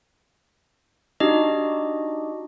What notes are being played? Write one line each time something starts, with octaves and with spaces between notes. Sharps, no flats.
D4 D#4 F#4 G4 D#5